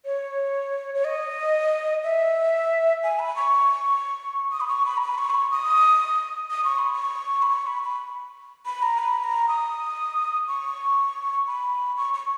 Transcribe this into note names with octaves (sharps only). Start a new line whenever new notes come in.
C#5
C#5
D#5
E5
G#5
B5
C#6
D#6
B5
C#6
B5
A#5
B5
C#6
B5
C#6
D#6
D#6
C#6
B5
C#6
B5
C#6
B5
B5
B5
A#5
B5
A#5
D#6
C#6
B5
C#6
C#6